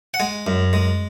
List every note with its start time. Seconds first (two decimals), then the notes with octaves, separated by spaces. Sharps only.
0.14 F#5
0.20 G#3 G#5
0.47 F#2
0.73 G#3